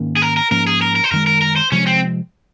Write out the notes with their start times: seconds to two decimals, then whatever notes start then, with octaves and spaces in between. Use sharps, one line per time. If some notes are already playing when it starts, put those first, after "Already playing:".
Already playing: G#2 D#3 A#3 C#4
0.17 G#4
0.22 A#4
0.37 A#4
0.51 G#2 F3 A#3 C#4 A#4
0.67 G#4
0.82 A#4
0.96 A#4
1.04 C5
1.11 F#2 D#3 G#3 A#4
1.27 A#4
1.42 A#4
1.56 C5
1.72 C3 F3 G#3 C#4
1.87 C4